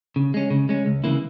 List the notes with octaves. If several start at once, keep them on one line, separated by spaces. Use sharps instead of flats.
C#3
G#3 C#4
C#3
G#3 C#4
C#2
C#3 E3 A#3 E4